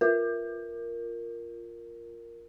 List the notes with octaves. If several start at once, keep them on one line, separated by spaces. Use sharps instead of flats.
F4 A#4